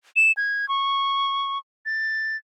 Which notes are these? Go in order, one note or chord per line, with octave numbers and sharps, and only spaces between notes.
E7
G#6
C#6
A6